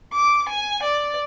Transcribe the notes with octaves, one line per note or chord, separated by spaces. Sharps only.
D6
G#5
D5